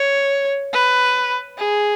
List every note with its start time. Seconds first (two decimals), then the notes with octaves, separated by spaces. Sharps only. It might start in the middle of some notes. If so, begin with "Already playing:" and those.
Already playing: C#5
0.73 B4
1.58 G#4